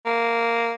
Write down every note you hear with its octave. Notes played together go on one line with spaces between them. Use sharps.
A#3